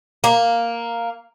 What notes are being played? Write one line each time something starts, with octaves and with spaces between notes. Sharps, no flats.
A#3